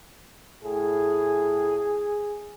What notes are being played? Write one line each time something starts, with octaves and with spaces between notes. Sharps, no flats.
A2 G#4